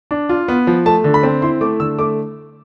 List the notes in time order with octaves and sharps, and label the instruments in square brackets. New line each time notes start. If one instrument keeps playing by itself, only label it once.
[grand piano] D4
F4
B3
F3
A3 A5
D3
B5
C4
E4 C6
A3 D6
D3 E6
A3 D6